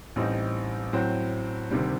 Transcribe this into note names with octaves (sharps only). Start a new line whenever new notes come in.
A1 A2 G3 C4 D#4
A2 F#3 C4
D2 C3 D#3 G3